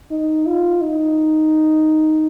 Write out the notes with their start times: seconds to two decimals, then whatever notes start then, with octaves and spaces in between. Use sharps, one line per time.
0.11 D#4
0.46 F4
0.81 D#4